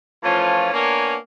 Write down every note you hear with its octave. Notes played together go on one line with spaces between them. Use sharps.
E3 F3 A3 C#4 F4
A#3 B3 D4 A#4 C#5 G#5